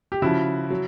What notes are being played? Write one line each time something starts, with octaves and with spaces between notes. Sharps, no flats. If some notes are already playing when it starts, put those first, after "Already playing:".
G4
C#3 F3 E4 F#4
F#3